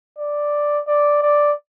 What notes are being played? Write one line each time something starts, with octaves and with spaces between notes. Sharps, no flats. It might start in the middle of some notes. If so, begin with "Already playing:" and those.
D5
D5
D5